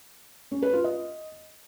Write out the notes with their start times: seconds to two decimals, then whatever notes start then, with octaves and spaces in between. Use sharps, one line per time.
0.52 C#4
0.62 B4
0.73 F4
0.84 D#5